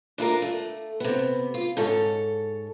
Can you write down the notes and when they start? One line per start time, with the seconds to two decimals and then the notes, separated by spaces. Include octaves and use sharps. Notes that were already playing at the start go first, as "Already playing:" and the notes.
0.18 D4 E4 F4 A#4
0.42 A3
1.00 C3 B3
1.54 F4
1.77 G#2 A4 C#5